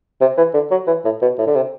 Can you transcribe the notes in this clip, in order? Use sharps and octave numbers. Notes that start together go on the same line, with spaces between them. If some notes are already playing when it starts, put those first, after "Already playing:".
C3
E3
D3
F#3
E3
A2
B2
A2
D3
C3